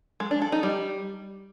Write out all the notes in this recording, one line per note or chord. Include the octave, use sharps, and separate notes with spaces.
G#3
D4
A4
D#4
G3